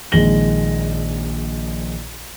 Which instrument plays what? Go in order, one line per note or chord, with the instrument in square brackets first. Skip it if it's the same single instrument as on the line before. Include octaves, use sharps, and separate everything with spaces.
[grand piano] A#1 D#3 G#3 A#6 F#7 G7